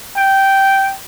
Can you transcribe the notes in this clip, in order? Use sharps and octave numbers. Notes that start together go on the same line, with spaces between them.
G5